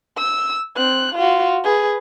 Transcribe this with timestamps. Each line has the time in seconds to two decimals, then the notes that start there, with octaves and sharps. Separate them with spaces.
0.18 E6
0.77 C4 F#6
1.15 F4 F#4
1.64 G#4 B4